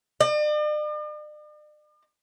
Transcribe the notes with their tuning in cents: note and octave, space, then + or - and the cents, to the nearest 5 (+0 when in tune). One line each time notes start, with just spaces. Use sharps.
D5 +45